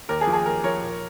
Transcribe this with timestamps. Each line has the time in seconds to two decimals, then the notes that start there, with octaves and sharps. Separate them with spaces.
0.09 D#2 A#4
0.21 G#4
0.27 F3
0.33 G#4
0.46 D#2 A#4
0.64 F3 A#4 C#5
0.82 A#2